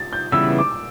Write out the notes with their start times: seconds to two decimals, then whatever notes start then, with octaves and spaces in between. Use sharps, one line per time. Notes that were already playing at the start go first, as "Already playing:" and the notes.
Already playing: A6
0.13 G6
0.32 C#3 E3 G3 B3 E4 E6
0.58 D6